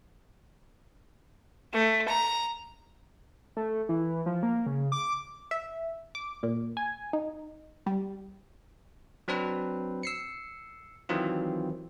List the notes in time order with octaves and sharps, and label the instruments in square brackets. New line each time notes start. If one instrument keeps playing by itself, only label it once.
[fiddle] A3
A#5
[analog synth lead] A3
E3
F3
A#3
C#3
D6
[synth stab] E5
D6
A#2
G#5
D#4
G3
[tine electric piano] F#3 C4 D4 B4
E6 C7 C#7
D#3 E3 F#3 C4 F4